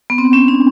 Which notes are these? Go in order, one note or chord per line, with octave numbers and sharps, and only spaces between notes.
B3
C4
C#4
D4